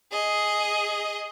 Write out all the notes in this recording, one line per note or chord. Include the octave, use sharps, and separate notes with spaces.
G#4 D#5